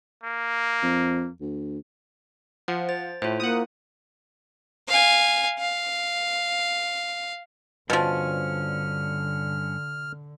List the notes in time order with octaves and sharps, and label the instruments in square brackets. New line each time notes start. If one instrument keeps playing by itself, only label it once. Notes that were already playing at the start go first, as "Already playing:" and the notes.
[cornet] A#3
[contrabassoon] F2
D2
[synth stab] F3 [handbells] F#5
[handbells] C5 A6
[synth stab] A2 [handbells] F4 C5
[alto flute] A#3 [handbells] E4 [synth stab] F#5 D#6
[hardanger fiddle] F5 G#5
F5
[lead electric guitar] G2 C#4 [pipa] B2 F3 [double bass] D3 [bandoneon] F6